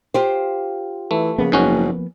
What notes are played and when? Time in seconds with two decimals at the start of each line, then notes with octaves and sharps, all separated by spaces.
0.14 F4 G4 C5
1.11 E3 A3
1.38 C#3 F3 A#3 B3
1.52 F#1 G#2 C#4 F#4